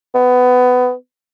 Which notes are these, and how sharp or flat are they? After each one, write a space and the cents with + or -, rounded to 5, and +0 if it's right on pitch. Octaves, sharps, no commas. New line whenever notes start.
B3 +20